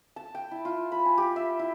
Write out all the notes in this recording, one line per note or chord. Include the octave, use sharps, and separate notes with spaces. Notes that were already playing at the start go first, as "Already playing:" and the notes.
A5
G5
E4
F4
B5
G#5
G4
E5
E4